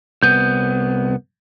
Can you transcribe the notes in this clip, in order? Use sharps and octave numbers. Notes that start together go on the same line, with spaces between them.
C2 B3 G6